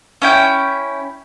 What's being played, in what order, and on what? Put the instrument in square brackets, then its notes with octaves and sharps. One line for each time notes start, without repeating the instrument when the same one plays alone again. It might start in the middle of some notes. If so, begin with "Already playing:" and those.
[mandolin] C#4 E4 G5